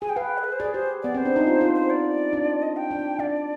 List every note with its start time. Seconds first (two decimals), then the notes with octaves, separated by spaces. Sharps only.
0.02 G#4 G#5
0.09 G5
0.16 B4 F5
0.24 G5
0.38 G#4
0.44 B4
0.52 C5
0.60 G#4 D5
0.74 G4 C5
1.03 B3 D5
1.14 C4 C5
1.26 D4
1.36 D#4
1.47 F4
1.61 F4
1.75 C5
1.90 D5
2.33 D4
2.62 D#5
2.77 G5
2.91 D4
3.19 D4 D5